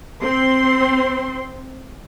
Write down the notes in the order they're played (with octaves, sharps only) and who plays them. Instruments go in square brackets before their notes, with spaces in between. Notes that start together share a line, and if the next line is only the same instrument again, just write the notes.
[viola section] C4 C6